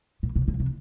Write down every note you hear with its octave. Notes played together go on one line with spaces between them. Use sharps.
A#2
C3
D3
C3